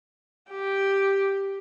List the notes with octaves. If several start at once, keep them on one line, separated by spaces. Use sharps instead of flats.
G4